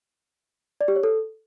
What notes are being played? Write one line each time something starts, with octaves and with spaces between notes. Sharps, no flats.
D5
G4
C#5
A4